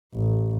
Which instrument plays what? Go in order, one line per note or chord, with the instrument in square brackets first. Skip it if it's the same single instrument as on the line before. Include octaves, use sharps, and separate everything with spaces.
[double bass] A1